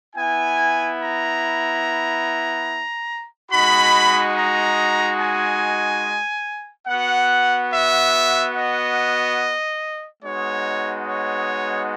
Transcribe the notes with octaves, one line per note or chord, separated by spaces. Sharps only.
B3 E4 G#5
A#5
G#3 D#4 F#4 B5
A#5
G#5
B3 F#4 F#5
E5
D#5
G#3 B3 D#4 F#4 C#5
C#5